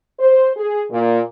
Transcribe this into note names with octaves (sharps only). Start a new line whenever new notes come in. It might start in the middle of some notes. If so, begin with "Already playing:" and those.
C5
G#4
A#2